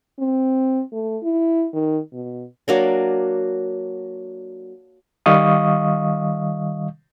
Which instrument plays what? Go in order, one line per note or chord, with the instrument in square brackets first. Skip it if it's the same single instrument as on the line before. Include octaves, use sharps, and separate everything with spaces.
[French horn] C4
A3
E4
D#3
B2
[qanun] F#3 A#3 D4
[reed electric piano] D#3 G3 D#5 F5 C#6 D#6